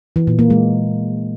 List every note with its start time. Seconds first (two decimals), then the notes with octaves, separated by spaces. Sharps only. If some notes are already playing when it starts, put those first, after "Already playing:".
0.16 E3
0.27 A#2
0.39 A#3
0.50 G#3